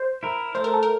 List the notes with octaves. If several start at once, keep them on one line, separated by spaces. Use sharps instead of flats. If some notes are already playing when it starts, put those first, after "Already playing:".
Already playing: C5
E4 A#4
A3 C5
A#4
A4
A#4